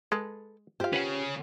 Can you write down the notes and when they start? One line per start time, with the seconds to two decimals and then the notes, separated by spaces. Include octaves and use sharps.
0.12 G#3 A4 B4
0.80 F4 G4 C5 F5
0.93 C#3 C#4 B4 F#5